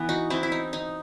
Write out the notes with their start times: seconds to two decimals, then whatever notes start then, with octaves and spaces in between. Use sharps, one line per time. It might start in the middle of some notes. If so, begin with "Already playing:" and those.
Already playing: E3 B3
0.09 D#4 F#4
0.30 C4 E4
0.43 E4
0.52 D#4
0.73 D#4